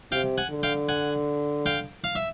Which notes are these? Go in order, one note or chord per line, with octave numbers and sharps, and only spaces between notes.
C3 F5 G5
F#5 G#5
D3
F5 G5
F#5 G#5
F5 G5
F5
E5